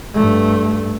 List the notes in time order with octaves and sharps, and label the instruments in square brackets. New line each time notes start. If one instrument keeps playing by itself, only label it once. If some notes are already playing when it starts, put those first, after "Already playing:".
[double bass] G2 A3